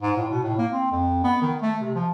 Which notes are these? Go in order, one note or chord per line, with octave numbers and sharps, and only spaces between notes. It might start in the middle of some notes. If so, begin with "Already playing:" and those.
G#2
A2
B2
A2
A#3
C4
F2
B3
D#3
A3
C3
F3